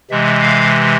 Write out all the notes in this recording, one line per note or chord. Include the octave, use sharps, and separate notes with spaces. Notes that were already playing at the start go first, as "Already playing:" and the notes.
C3 E3 G#3 E5
F5